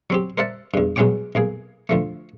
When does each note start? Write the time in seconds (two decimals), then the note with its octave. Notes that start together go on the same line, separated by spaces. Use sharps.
0.10 F#3 C4 G4
0.38 A#4 C5 D5 E5 F#5 A5
0.74 E2 G2
0.96 B2 F#3 G#3 C#4 G5 D6
1.35 B1 A#3 G#4
1.89 D2 F3 A3